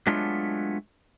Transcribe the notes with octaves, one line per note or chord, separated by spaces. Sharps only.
F#3 G#3 A3 B3 D4 F4